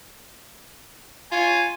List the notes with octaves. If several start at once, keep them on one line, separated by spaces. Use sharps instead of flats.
F4 C#5 G#5